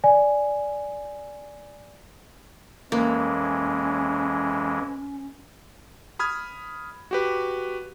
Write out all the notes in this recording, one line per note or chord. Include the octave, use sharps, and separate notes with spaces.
D5 G#5
F2 E3 G#3 A#3 C#4
B5 D#6 F6 G#6
F#4 G4 B4